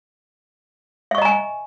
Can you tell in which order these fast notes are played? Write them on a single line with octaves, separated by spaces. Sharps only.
E5 C#6 D#5 A#5 G#5